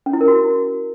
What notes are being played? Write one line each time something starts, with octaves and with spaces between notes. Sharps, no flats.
C#4
E4
A#4
F#4
E4